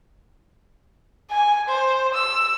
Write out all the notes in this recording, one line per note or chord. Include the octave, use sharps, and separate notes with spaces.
G#5
C5
E6